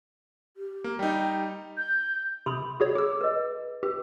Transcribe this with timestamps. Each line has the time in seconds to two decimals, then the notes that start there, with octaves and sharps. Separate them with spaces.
0.57 G4
0.84 A#3
0.99 G3 D#4 G5
1.77 G6
2.46 C3 B5 C6 D#6
2.80 F#4 G#4 C#5
2.95 G#4 D6 E6
3.21 B4 D#5
3.83 G4 B4